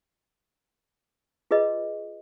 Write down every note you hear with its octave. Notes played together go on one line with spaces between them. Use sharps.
F4 G#4 B4 D#5